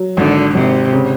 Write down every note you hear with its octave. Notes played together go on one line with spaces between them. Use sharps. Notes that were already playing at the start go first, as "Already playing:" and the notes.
Already playing: F#3
G#1 D3
G#1 C3
C#3